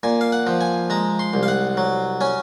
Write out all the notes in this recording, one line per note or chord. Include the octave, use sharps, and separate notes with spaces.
A#2 G#5
F5
F#5
F3
G#5
G#3 A#5
C6
C2
F5
F#5
F#3
C#4 G#5